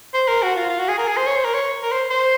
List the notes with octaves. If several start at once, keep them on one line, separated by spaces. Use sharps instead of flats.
C5
A#4
F#4
F4
F4
F#4
G#4
A#4
G#4
C5
C#5
C5
A#4
C#5
A#4
C5
C5